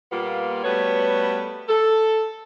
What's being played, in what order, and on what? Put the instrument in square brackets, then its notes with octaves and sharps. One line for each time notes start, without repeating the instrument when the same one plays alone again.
[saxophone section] A#2 G3 A#3 B3 F4
G3 A3 B3 F#4 B4 C#5
A4